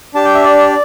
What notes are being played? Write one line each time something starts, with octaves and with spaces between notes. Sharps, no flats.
D4 G4 A5
G5
E5
D5